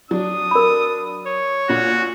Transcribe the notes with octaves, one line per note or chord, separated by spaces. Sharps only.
F#3 D4 D#6
A#4 B5
C#5
A#2 F#4